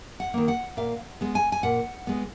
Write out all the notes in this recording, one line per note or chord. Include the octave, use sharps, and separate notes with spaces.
F#5
D#3 A#3
F#5
A#2 F5
G#3 B3
G#5
G#5
A#2 F#5
G#3 B3